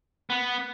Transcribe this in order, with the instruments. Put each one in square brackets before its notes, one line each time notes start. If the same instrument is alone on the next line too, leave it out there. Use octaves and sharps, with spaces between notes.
[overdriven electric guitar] B3